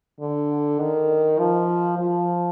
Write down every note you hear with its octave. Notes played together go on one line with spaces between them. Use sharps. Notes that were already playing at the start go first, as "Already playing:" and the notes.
D3
D#3
F3
F3